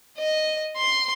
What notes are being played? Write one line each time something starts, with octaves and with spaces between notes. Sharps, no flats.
D#5
C6